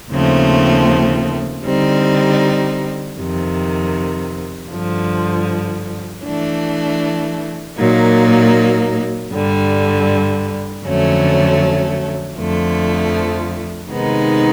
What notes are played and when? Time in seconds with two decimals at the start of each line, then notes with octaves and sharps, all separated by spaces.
0.10 D#2 C#3 F3 A3 C4
1.64 D3 G3 C4 D#4
3.18 F2 C3 D#3
4.71 G2 D3 F3
6.24 E3 A3 D4
7.78 A#2 F#3 A#3 D#4
9.31 G2 D3 G3
10.85 F2 D3 F#3 A3 C#4
12.38 F2 D3 F3 A3
13.91 C3 D#3 G#3 B3 D#4